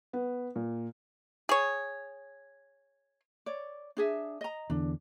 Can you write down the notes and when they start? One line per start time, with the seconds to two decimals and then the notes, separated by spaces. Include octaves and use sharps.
0.13 B3
0.56 A#2
1.49 G#4 C#5
3.46 C#5 D5
3.97 D4 G#4 E5
4.41 D#5 A#5
4.70 E2 D3 D4